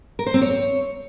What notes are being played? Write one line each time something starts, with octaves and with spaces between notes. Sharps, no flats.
A#4
C5
C4
C#5